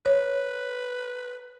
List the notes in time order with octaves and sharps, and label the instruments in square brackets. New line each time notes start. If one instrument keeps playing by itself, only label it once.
[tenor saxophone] B4 [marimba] C#5